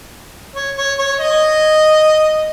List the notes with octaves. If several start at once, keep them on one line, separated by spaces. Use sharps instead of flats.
C#5
C#5
C#5
D#5